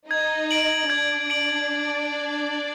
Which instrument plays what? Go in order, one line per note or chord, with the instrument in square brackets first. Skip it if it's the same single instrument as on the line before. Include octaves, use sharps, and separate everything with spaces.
[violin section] D#4 D#5 [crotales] G#6
[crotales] D7 F#7
[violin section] D4 D5 [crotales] G#6
[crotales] D7 F#7